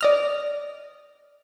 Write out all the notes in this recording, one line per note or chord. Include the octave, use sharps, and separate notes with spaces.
D5 D#5 F6